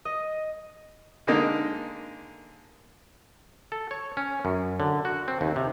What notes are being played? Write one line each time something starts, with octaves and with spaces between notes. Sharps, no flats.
D#5
D3 G#3 A#3 D#4
A4
C#5
C#4
F#2
D3
F#4
C4
D#2
C3